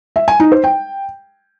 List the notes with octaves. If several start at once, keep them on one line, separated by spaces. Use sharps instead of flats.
E5
G#5
D#4
C5
G5